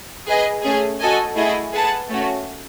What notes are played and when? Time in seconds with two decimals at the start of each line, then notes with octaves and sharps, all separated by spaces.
0.27 G#4 B4 D#5
0.63 A3 C#4 G#4
1.00 F#4 A4 D#5 G#5
1.36 A3 E4 G#4 D#5 F#5
1.73 G#4 B4 F#5 A5
2.09 A3 C#4 F#4